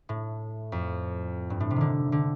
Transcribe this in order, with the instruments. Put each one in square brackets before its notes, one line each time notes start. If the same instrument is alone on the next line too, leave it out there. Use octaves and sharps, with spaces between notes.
[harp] A2
F2
G2
A2
C3
D3 D#3
D3